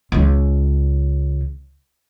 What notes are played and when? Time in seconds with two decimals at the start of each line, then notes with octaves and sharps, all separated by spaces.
0.12 C#2 C#3